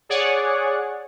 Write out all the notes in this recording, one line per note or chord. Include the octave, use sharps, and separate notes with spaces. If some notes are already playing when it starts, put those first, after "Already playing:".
G#4 C#5 D5 F#5